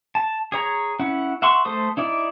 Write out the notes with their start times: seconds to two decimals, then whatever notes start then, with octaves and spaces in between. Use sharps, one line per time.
0.15 A5
0.52 G#4 C#5 A#5
0.99 C#4 E4 F#5
1.42 E5 F#5 C6 C#6
1.65 A3 A4 C5 D#6
1.97 D#4 E4 D5